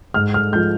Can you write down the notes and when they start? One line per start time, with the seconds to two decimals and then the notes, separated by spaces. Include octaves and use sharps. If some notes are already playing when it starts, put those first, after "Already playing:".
0.14 G#2 F6
0.34 F6
0.52 G#3 G6
0.56 F3